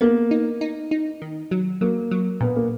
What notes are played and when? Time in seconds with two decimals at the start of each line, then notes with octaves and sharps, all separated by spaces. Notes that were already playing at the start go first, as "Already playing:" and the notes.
0.01 A#3 B3
0.31 D#4
0.61 D#4
0.91 D#4
1.22 D#3
1.51 F#3
1.81 F#3 A#3
2.11 F#3
2.41 A#2 B3
2.56 A#3